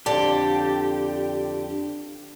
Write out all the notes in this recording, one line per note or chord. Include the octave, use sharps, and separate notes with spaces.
F2 D3 G4 D5 A5